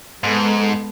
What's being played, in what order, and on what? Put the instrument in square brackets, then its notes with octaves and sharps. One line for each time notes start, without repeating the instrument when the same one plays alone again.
[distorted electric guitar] G#2 [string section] G#3 B3 A4